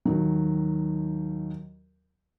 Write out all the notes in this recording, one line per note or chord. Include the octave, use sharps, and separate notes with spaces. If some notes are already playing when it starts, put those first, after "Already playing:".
D#2 D#3 F#3